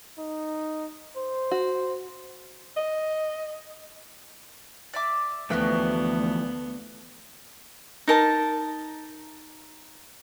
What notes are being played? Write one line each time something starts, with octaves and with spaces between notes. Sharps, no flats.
D#4
C5
F#4
D#5
D5 E5 D6
D2 E3 F3 A3 B3 F#4 B4 G5
D#4 A#4 A5